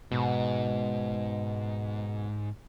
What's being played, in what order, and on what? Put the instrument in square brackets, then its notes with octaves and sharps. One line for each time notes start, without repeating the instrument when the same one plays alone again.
[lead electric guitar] G#2 [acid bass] B2